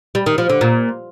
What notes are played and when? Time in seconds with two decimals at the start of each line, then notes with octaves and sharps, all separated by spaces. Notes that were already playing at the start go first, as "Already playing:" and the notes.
0.15 G3
0.26 D#3
0.38 F3
0.49 D3
0.61 A#2